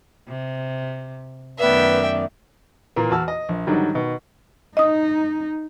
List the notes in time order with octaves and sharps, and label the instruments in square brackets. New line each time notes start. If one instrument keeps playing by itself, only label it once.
[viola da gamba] C3
[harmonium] F#2 D5 [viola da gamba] D#3 A3 B3 [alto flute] B4 [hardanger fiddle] E5 G5
[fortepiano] A#2 E3 A#3
E2 F#4 A5 E6 F6
D#5
A#1
G#2 D3 D#3 F#3 G3
B2 D#3
[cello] D#4 [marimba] D#5 D#6